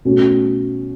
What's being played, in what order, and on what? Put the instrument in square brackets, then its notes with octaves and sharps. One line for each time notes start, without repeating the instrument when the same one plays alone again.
[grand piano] B2 A3 C#4 F#4